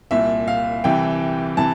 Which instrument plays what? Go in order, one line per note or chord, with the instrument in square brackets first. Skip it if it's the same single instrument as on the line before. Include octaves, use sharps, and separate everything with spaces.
[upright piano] C2 A#2 E5
F5
C2 C3 E3 G5
C3 E3 A5